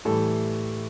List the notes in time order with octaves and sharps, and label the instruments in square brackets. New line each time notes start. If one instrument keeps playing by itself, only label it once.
[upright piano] A2 E3 G3 A4